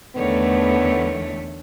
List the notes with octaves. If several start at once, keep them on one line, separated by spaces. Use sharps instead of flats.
E2 D3 D#3 A3 B3 C#5